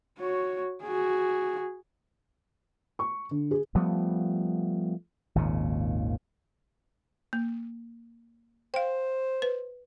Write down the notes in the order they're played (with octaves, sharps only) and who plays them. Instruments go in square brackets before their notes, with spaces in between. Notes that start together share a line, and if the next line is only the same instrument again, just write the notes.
[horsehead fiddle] F#4 C#5
F#4 G#4
[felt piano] C#6
D3
G#4
[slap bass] F3 G3 A3 B3
G#1 D#2 A#2 C#3
[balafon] A#3
[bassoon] C5 [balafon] F5 G5
[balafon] B4